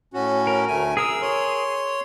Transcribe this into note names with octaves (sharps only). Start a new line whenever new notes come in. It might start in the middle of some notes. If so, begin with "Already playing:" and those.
A2 C#4 F#4
A#4
D2 A3 G#5
G#4 A#4 D#6 E6
C#5 C6